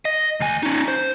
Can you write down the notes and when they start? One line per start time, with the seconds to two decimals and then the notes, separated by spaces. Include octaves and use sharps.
0.05 D#5
0.40 D2 G#5
0.63 C#4 D#4
0.88 C5